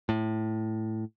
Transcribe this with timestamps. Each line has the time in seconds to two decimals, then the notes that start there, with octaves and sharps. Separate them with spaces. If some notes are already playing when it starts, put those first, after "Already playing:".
0.09 A2